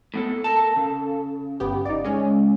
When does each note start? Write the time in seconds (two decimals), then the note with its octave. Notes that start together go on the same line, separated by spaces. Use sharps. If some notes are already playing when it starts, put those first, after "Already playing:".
0.14 A2 B3 A4
0.44 A4 A#4 A5
0.76 C#3
1.60 G1 B3 G4
1.85 D#4 D5
2.05 G#3 C#4